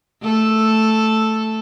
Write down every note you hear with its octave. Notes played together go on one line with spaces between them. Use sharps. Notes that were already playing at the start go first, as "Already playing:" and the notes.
A3 A4